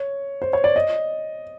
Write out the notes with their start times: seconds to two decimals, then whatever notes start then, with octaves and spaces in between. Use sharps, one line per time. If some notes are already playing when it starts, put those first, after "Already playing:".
Already playing: C#5
0.42 C5
0.53 C#5
0.64 D5
0.76 D#5